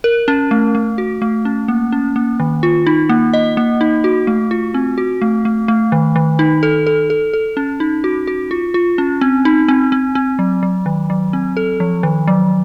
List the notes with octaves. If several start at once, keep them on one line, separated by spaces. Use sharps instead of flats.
A#4
C#4
A3
A3
F#4
A3
C#4
A#3
C#4
A#3
D#3
F4
D#4
A#3
D#5
A#3
D#4
F#4
A3
F4
C4
F#4
A3
A3
A3
D#3
D#3
D#4
A4
A4
A4
A4
C#4
D#4
F#4
F#4
F4
F4
C#4
C4
D#4
C4
C4
C4
F#3
F#3
D#3
F#3
C4
A4
F3
D#3
F#3